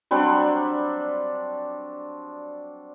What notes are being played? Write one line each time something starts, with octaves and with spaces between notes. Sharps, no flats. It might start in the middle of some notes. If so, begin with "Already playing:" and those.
F#3 G3 C4 D4